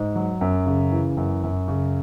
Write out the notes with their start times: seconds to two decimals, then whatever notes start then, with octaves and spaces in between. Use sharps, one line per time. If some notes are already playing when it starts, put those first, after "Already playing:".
Already playing: G#2
0.15 F#3
0.41 F#2
0.66 C#3
0.92 E3
1.17 F#2
1.43 F#2
1.68 C#3